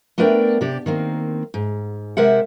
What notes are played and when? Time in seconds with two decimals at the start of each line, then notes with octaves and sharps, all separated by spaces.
0.18 A3 B3 D4 A#4 D5 G5
0.61 C3 G4 D5
0.86 D#3 A#3 C4
1.54 G#2
2.17 C3 G#3 A#4 C5 E5 F#5